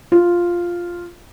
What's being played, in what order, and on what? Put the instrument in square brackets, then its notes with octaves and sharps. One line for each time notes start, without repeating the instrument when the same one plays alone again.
[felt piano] F4